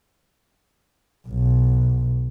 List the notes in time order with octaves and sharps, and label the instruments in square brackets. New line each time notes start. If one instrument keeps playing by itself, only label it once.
[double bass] B1